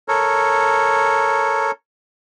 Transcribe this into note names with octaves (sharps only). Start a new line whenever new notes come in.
A4 A#4 C#5